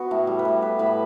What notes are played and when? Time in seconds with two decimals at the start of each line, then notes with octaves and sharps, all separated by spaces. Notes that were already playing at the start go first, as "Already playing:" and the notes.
Already playing: B3 F#4
0.11 A2
0.27 G3
0.39 B4
0.45 A2
0.62 B3 B4
0.79 A2 B4